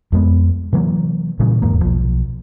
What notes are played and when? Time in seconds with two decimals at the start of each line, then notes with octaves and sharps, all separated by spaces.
0.12 F2 G#3 B3
0.73 C3 E3 F#3 A#3
1.39 A#2 C#3 E3 G3
1.62 D#1 E2 G#2 A#3
1.81 B1 F3